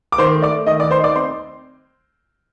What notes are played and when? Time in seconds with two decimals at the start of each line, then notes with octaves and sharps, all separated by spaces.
0.12 D6
0.18 D#3 C5 C6
0.34 A3
0.42 D5 D6
0.51 A3
0.67 D#3 D#5 D#6
0.80 D5 D6
0.83 D#3
0.91 C5 C6
0.99 D#4 D5 D6
1.16 C4 C5 C6